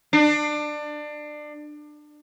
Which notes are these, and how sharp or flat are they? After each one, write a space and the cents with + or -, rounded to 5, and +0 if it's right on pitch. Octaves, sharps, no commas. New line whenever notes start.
D4 +25